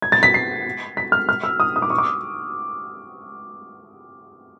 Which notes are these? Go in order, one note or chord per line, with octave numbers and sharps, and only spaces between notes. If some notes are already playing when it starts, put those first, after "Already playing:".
G#6
A6
B6
C7
B6
F6
F6
E6
D#6
D#6
D6
C#6
D6